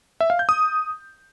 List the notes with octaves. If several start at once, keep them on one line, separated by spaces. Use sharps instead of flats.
E5
F5
G6
D#6